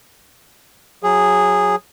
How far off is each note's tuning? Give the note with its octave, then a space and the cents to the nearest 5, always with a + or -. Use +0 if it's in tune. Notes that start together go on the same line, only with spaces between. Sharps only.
F#3 -15 G#4 -10